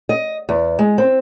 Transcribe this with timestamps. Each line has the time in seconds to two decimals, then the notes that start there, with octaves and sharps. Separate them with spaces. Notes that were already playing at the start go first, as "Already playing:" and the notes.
0.09 D#5
0.49 E2
0.79 G#3
0.98 C4